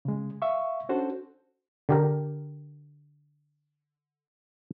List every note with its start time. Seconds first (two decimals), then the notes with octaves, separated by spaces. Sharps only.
0.05 C#3 G#3
0.42 E5 F5 C#6
0.89 C#4 D4 F#4 A4 C5
1.89 D3 G4 A#4